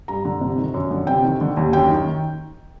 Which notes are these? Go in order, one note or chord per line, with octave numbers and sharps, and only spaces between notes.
G2 A#5
D3
C3
D#3
F#2
D3
C3 G5
D#3
D3
D#2
F#2 G5
D#3